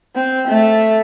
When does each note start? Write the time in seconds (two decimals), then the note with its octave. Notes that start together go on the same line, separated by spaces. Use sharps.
0.15 C4
0.47 A3